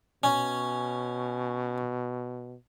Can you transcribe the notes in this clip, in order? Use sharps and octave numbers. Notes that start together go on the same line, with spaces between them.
B2 C#4